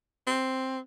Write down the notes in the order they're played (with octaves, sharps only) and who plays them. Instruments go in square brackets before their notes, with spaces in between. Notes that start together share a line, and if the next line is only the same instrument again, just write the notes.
[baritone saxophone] C4